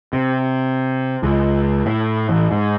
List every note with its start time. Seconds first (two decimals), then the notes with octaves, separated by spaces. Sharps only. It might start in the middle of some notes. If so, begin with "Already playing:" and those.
0.13 C3
1.23 C#2
1.86 A2
2.29 A1
2.51 G#2